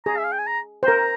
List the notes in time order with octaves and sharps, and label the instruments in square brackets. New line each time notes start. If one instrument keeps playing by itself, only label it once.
[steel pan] G#4 [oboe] A#5
[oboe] E5
F5
G5
G#5
A#5
[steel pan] C5
[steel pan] A#4 [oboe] A#5